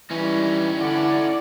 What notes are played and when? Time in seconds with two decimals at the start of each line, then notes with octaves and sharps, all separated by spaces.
0.11 E3 G3 C#4 D#4
0.79 D3 E4 D5 F#5